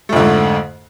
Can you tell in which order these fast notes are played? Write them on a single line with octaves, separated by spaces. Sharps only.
A3 F2 D3 G#2